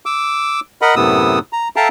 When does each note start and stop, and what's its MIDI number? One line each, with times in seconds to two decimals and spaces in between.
0.06 0.60 86
0.06 0.60 88
0.82 0.95 70
0.82 0.95 75
0.82 0.95 78
0.82 0.95 83
0.96 1.39 42
0.96 1.39 45
0.96 1.39 48
0.96 1.39 59
0.96 1.39 87
0.96 1.39 88
1.53 1.68 82
1.76 1.88 69
1.76 1.88 76
1.76 1.88 77
1.76 1.88 79
1.76 1.88 81
1.76 1.88 82